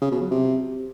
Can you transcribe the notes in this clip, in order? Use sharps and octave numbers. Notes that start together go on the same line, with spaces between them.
C#3
B2
F#3
C3